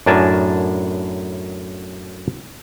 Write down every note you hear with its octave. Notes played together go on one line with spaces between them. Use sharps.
F#2 A2 D4 A#4 G#5 A5